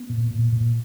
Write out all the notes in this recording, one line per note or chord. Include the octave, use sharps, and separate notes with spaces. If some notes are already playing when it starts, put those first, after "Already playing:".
Already playing: B3
A#2
A#2
A#2